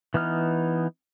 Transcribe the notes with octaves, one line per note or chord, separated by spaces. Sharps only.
E3 B3 D#4 F6